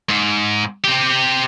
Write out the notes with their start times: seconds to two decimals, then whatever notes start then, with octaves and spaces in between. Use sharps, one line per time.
0.09 G#2
0.84 C4 G4